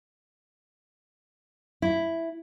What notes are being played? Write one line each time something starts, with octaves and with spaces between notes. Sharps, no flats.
E4